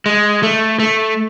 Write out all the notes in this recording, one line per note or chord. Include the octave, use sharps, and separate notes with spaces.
G#3
A3
A3